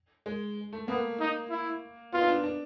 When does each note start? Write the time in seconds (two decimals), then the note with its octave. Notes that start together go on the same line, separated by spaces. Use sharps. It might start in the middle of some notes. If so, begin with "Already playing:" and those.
0.26 G#3
0.73 A3
0.88 A#3 B3
1.20 D#4
1.50 E4
2.13 B3 F4
2.22 D#4
2.28 D4
2.44 D4